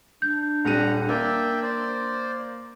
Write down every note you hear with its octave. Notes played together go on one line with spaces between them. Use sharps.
D4 G6
D#1 G3 F#5 A#5 D#7
A#3 D5 E5 G5
C5 D5